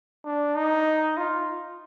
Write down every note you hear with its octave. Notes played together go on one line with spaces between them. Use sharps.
D4
D#4
F4